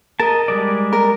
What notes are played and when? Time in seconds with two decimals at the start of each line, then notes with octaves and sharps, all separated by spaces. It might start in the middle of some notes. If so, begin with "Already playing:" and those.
0.20 A#4 D#5 A5
0.48 G3 G#3 D5
0.93 A#4